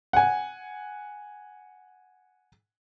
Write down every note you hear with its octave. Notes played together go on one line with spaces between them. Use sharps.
F#5 G#5